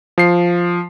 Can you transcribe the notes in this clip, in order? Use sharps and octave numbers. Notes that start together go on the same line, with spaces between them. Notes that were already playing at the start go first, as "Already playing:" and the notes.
F3 C7